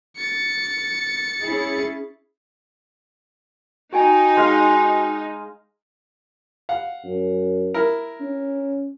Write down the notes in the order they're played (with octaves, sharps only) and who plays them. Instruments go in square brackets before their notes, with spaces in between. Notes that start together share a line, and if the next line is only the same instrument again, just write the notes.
[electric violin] A6 C#7
[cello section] C#4 E4 G#4
[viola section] D#4 [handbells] F#4 G5 G#5
[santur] G#3 D#5 F5
[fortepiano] F5 F#5
[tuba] F#2
[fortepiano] E4 A#4
[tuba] C#4